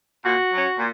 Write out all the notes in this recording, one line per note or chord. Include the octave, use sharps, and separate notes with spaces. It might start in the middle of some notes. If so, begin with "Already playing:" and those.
A#2 F#4
F#3 C#4
A#2